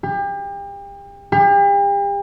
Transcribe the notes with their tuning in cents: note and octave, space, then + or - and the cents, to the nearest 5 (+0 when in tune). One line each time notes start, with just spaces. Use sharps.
G4 +35
G4 +40